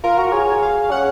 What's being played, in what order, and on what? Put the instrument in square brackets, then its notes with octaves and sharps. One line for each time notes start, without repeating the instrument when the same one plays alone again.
[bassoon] F4 [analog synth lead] A#4
[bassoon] F#4
[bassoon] G#4 [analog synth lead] C#5
[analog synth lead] F5
[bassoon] C#4 [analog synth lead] F#5